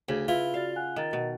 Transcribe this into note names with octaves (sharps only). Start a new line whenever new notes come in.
D2 C#3 G#6
E4 F4 B4
F#4 D5 F5 A6
F#5 G#5 F#6
D#3 A#4 A#5 A6
B2